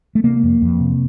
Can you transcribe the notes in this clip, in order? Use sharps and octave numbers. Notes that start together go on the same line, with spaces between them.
A3
C3 A#3
F2
F2
C3